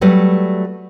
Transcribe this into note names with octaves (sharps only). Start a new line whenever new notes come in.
F#3 G3 A3 B4